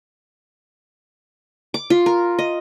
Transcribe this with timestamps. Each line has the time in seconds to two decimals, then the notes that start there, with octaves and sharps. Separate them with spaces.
1.74 D6
1.90 F4
2.06 A#4
2.39 D#5